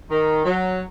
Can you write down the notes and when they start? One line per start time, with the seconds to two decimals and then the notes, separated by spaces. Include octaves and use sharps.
0.10 D#3
0.44 F#3